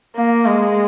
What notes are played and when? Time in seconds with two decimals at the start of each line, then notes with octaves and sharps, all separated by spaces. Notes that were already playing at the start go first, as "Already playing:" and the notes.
0.16 A#3
0.46 G#3